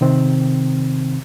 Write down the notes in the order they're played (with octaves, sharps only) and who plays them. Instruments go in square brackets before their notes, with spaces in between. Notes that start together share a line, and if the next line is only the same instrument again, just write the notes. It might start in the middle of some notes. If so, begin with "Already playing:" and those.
[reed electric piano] C3 D#3 C4